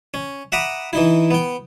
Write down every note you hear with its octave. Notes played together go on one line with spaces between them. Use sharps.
C#4
E5 F#5 A#5 B5 D6 D#6
E3 D#4 E4
B3 G5